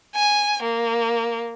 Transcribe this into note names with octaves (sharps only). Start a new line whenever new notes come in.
G#5
A#3